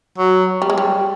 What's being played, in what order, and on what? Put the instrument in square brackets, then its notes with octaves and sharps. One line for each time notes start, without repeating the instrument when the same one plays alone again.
[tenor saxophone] F#3
[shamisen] G3
G#3
G3